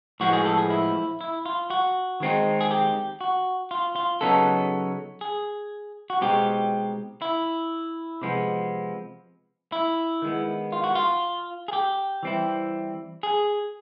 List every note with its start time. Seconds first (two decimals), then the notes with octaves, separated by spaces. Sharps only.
0.20 A2 F3 G#3 B3 F#4
0.33 G#4
0.45 A4
0.58 G#4
0.70 E4
1.21 E4
1.46 F4
1.70 F#4
2.20 D#3 G#3 C4 D#4
2.61 G#4
2.71 G4
3.21 F#4
3.71 F4
3.96 F4
4.21 C#3 F#3 B3 D#4 A4
5.21 G#4
6.10 F#4
6.21 B2 G#3 C4 D#4 G4
7.22 E4
8.22 C3 F3 G#3 B3
9.72 E4
10.22 D#3 G#3 B3
10.72 F4
10.84 F#4
10.95 F4
11.68 G#4
11.73 G4
12.23 E3 G3 C4 E4
13.23 G#4